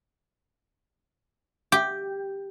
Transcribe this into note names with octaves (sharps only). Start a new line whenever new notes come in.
G4